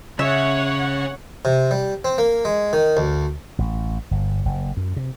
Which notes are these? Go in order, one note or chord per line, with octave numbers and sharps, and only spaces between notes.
C#3 C#5 E5 F#5
C3
G3
C4
A#3
G#3
D#3
D2
A1
G1
F#1
F#2
C3